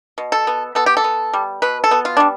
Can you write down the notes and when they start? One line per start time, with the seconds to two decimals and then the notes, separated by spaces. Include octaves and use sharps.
0.18 B2
0.32 A4
0.47 B3
0.75 B3 A4
0.86 G4
0.97 A4
1.04 B3
1.33 G3
1.62 B2 B4
1.84 A4
1.91 B3
2.05 F4
2.17 G3 D4